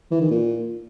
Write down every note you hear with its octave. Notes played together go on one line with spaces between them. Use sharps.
E3
D#3
A#2